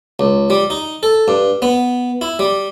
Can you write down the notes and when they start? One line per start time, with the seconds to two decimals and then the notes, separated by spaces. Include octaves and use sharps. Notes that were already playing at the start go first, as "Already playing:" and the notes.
0.19 C#2
0.50 G3
0.70 D#4
1.03 A4
1.28 G2
1.62 B3
2.21 E4
2.39 G3